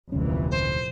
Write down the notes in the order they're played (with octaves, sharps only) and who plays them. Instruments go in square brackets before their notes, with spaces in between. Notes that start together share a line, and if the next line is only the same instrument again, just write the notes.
[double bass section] F1 A#2 E3 [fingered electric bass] D2 F#3 C#4
[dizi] C5